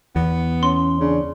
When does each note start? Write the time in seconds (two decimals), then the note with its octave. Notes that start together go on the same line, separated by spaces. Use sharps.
0.16 E2 B3
0.63 C#4 C6
1.00 C#3 D4